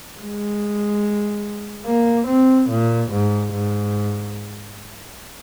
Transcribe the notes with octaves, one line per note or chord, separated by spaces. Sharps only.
G#3
A#3
C4
A#2
G#2
G#2